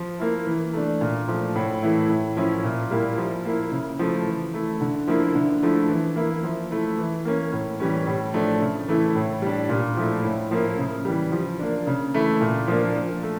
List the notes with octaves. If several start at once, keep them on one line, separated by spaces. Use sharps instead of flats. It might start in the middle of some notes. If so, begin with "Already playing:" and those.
Already playing: F3
A#3 E4
E3
A3 D4
A#2
F3 A3
A2
E3 A3 E4
A2
F3 C#4 E4
A#2
G3 A#3 E4
F3
A#3 E4
C#3
F3 A3 E4
E3
A3 E4
D3
F3 A#3 E4
D3
F3 A3 E4
E3
A#3 E4
F3
A3 E4
E3
A#3 C#4
A2
E3 G3 C#4
A2
F3 A3 D4
C#3
E3 A3 E4
A2
G3 D4
A#2
F3 A3 E4
A2
F3 A#3 E4
C#3
E3 G3
F3
A#3 D4
C#3
E3 A3 E4
A#2
F3 A#3 D4
F3
A3